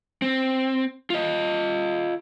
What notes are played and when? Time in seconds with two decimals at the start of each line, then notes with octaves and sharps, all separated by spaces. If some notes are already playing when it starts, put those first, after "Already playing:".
0.22 C4
1.10 F4 D#5